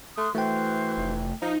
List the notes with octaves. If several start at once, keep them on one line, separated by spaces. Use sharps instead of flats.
A3 C6 D#6 F#6
E3 A3 F#4 C5 G5
F1
F3 D#4